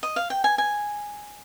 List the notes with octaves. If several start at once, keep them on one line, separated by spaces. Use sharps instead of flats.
D#5
F5
G5
G#5
G#5